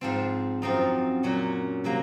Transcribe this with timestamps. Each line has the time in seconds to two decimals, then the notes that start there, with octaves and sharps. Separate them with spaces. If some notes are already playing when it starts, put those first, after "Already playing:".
0.01 G#2 F3 C4
0.62 F#2 F3 C4 D#4
1.23 A#2 F#3 C#4
1.84 C3 F#3 A#3